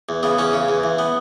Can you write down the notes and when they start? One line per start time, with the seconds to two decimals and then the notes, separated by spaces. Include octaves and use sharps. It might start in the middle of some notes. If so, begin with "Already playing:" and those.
0.09 E2
0.23 C#3 B3
0.38 E2 C#4
0.53 C#3
0.68 E2
0.84 E2
0.99 B3